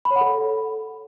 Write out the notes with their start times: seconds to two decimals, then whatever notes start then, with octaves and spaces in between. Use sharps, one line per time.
0.05 B5
0.11 C#5
0.16 F#5
0.21 A4